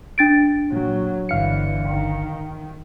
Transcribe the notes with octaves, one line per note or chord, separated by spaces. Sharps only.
D4 A6 D7
A#2 F#3
G1 D3 E3 F5 C#7
D#3